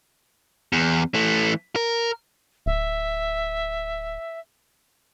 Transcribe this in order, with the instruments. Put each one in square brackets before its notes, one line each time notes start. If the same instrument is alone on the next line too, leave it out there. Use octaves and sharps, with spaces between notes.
[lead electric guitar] E2
E3 A3
A#4
[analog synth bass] D1 [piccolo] E5